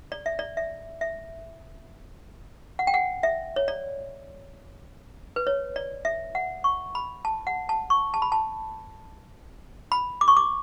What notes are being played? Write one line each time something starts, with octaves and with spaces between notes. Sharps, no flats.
D5
E5
D5
E5
E5
F#5
G5
F#5
E5
C#5
D5
B4
C#5
D5
E5
F#5
C#6
B5
A5
F#5
A5
C#6
A5
B5
A5
B5
D6
C#6
D6